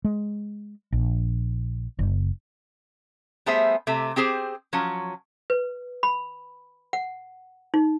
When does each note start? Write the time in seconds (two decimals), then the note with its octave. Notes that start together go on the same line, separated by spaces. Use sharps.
0.05 G#3
0.92 A#1
1.99 F#1
3.46 G3 A3 B3 G#4 C5 E5
3.87 C3 A3
4.16 C4 G4 G#4 C5
4.73 F3 F#3 C#4
5.50 B4
6.03 B5
6.93 F#5
7.74 D#4